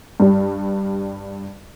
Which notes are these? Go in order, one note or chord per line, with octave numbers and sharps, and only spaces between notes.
G2 G3